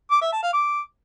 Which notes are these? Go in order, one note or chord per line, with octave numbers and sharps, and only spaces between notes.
D6
E5
A5
F5
D6